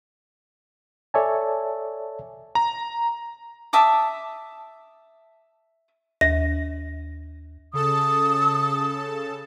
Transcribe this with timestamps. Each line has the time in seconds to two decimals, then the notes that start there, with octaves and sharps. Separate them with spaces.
1.14 A4 C#5 D5 E5 G#5 A5
2.55 A#5
3.73 E5 A5 D6 D#6
6.21 D#2 A#6
7.73 C#3 A4 A5 D#6